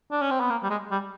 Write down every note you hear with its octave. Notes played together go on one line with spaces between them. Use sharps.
D4
C#4
C4
B3
A#3
G3
G#3
G3